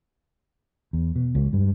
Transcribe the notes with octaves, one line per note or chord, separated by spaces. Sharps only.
E2
B2
C#2
G2